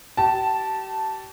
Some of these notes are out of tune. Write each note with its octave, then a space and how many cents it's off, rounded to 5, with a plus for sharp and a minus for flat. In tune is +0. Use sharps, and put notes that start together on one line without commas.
G4 -35 A5 +0